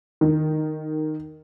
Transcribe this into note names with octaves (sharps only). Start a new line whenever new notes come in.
D#3